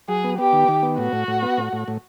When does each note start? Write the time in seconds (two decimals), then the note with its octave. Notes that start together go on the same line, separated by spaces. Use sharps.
0.08 F#3 G#4
0.24 B3
0.38 B3 G4
0.53 D#3
0.68 D#3
0.83 B3
0.98 A2 F#4
1.13 A2
1.28 A2
1.42 B3
1.58 A2
1.73 A2
1.88 A2